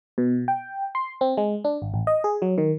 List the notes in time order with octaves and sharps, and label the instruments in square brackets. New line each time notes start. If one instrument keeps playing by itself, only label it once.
[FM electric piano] B2
G5
C6
C4
G#3
D4
G#1
A1
D#5
G#4
F#3
D#3